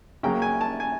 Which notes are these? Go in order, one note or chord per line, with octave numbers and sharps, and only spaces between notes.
C#3 F#3 A#3 G5
G#5
A5
G#5